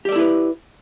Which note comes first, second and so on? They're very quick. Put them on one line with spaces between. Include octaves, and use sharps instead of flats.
G4 D5 A4 E4 B4